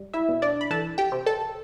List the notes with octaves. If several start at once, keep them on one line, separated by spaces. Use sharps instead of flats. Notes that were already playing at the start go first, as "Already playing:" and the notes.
Already playing: G3
E4 E5
B2
D4 D5
B5
E3 A4 A5
G4 G5
C3
A4 A5